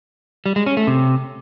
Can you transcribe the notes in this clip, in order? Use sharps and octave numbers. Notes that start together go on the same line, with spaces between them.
G3
G#3
C#4
A3
C3